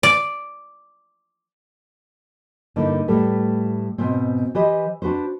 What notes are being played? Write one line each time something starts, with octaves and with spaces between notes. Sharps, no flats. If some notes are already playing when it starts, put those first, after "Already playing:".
D5
G2 D3 A#3 D#4 E4
A2 G3 A3 B4
G#2 B2 B3 C4
E3 G4 B4 C5 D#5
D4 F#4 B4 C5